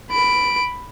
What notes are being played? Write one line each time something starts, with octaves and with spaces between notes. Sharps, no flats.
B5 D7